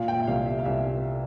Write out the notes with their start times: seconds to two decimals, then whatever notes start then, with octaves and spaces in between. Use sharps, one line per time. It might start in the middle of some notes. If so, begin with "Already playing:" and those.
Already playing: A#2 F5
0.08 G5
0.20 E5
0.27 C2 F5
0.46 E5
0.59 F5
0.65 C2 E5